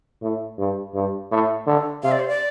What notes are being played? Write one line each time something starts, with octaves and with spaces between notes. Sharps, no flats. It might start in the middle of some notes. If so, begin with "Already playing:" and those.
A2
G2
G2
A2
D3
C3 F5
D5
C5
D5